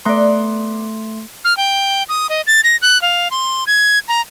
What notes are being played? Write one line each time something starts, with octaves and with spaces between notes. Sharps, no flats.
A3 B3 D5 C6
F6
G5
D#6
D#5
A6
A#6
F#6
F5
C6
G#6
A#5